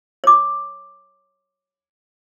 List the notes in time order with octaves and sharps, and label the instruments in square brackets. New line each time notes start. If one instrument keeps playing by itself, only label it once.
[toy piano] C#5 D6